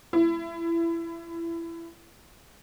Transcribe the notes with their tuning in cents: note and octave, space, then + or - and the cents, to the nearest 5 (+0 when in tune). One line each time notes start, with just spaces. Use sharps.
E4 +25